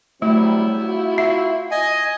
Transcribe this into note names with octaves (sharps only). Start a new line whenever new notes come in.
F#3 G3 A3 C4 E4
F4 F#4
E5
D#5 G#5